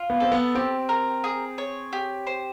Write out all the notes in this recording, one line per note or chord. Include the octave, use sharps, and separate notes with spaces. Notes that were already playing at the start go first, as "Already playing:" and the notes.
Already playing: F4
B3
C4 A4
B3
C4 G4
A#4
G#4
C#5
G4
C5